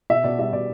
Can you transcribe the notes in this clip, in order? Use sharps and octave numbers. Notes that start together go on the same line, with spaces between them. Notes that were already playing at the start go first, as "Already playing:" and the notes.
B2 E5
B2 D5
G3 E5
B2 D5